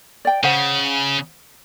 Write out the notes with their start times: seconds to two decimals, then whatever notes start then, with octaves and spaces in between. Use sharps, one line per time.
0.25 D5 G5
0.43 C#3 C5 F#5